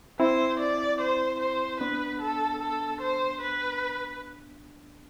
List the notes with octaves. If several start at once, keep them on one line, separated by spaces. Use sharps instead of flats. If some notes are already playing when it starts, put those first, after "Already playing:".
C4 E4 C5
D5
C5
C5
B3 D4 B4
A4
A4
C5
B4